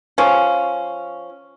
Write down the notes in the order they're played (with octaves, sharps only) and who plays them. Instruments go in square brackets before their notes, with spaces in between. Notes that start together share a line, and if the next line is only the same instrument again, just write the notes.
[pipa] F3 C#4